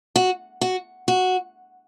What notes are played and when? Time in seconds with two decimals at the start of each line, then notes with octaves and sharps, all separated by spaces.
0.16 F#4
0.61 F#4
1.08 F#4